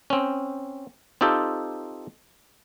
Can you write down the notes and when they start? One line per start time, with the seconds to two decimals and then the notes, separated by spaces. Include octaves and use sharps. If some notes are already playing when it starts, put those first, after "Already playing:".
0.10 C4 C#4
1.21 C4 D#4 F4 G4 A4